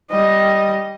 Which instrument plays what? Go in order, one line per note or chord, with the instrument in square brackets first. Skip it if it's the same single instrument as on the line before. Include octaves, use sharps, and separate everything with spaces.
[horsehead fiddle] G3 D#5